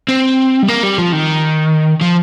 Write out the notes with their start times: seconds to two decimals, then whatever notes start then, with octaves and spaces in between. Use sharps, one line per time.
0.09 C4
0.63 G3
0.68 A#3
0.83 G3
0.98 F3
1.12 D#3
2.01 F3